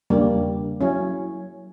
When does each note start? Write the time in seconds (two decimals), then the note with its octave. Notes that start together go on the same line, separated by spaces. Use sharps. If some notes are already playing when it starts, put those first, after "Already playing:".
0.10 E2 C#3 G3 A#3 D4
0.81 F#3 C#4 E4